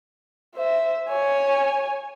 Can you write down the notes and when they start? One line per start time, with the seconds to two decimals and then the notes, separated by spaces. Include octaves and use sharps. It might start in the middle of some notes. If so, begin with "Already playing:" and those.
0.55 C5 E5
1.09 C#5 G#5